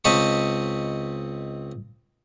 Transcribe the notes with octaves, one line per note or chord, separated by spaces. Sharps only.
C#2 C4 D#5 A5 B5 C#6